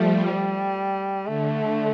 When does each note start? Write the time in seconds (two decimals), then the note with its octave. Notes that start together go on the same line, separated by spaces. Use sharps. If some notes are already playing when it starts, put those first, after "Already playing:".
Already playing: F3 G3 A3
0.26 G3
1.26 D3 A3